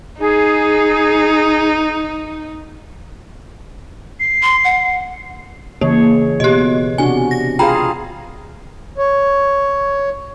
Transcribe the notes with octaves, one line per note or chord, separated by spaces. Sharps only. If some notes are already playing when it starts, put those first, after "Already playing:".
D#4 G#4
C7
C6
F#5
C#3 E3 A#3 C#5
B2 G4 D#5
C3 D4 F#4 G#5
A#6
F4 G#4 F5 G5 A#5 B5
C#5